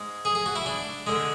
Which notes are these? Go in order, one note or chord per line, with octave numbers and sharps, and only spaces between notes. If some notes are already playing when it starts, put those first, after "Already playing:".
Already playing: G#2 G#3
G#4
G#4
F#4
E4
D4
D3 G#3